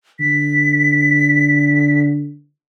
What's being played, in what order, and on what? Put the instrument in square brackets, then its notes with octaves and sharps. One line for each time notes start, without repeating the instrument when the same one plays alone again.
[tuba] D3 [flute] B6